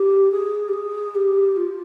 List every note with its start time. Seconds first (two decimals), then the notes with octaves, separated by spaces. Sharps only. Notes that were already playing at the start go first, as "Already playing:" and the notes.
Already playing: G4
0.31 G#4
0.68 G4
0.73 G#4
1.15 G4
1.56 F4